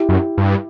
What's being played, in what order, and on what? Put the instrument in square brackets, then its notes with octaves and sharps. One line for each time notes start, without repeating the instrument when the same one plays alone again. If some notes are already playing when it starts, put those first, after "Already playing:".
Already playing: [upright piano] E4 G4
[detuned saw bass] F#2
G2